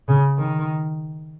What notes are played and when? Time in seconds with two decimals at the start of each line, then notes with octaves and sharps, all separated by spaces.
0.08 C#3
0.38 D#3